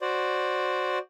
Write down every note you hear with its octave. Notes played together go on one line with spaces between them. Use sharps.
F#4 C5 D5